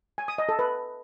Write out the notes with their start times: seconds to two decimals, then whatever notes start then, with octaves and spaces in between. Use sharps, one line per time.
0.18 G#5
0.28 D#6
0.38 D#5
0.49 A4
0.59 B4